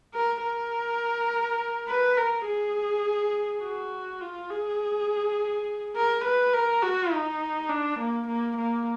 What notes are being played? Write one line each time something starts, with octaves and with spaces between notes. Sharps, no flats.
A#4
A#4
B4
A#4
G#4
F#4
F4
G#4
A#4
B4
A#4
F#4
D#4
D4
A#3
A#3
A#3